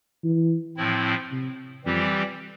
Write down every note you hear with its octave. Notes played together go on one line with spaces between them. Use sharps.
E3
A2 F3 C4 E4
C3
F2 E3 G3 C4 G4